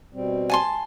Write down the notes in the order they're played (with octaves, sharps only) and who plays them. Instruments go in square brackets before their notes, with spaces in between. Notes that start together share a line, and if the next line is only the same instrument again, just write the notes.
[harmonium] B2 G3 C4
[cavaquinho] G#5 A5 C6